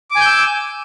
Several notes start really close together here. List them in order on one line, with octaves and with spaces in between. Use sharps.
D6 G#5 G6 E6